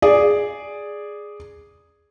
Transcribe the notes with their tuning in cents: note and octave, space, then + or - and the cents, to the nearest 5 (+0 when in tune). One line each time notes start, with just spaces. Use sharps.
G#4 +0 D5 +0